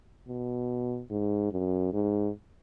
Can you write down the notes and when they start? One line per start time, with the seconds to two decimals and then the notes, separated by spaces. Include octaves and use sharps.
0.28 B2
1.10 G#2
1.52 F#2
1.93 G#2